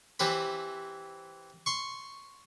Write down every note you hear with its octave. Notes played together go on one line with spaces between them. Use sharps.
E3 C4 G4 B4 B5
C6 C#6